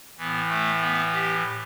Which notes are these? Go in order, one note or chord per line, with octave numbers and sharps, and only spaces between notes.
A2 E3 B3
A3
B3
G4